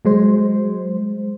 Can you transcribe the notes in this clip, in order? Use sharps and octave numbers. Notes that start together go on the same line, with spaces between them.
F#3 G#3 C5